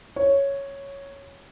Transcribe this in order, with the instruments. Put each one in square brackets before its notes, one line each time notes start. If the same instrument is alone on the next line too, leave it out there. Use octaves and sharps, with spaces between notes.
[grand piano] C#5